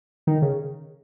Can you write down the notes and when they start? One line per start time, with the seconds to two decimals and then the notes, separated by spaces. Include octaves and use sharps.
0.27 D#3
0.42 C#3